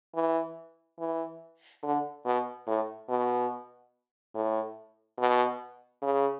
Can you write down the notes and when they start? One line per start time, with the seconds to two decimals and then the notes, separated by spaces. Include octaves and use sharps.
0.15 E3
0.99 E3
1.83 D3
2.25 B2
2.67 A2
3.09 B2
4.35 A2
5.19 B2
6.02 C#3